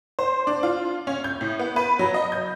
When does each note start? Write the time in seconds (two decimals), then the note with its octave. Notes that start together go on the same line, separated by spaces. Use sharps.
0.19 C5
0.47 D4
0.63 F4
1.07 C#4
1.24 G6
1.41 A2
1.59 B3
1.76 B4
1.99 F#3
2.14 D#5
2.32 G6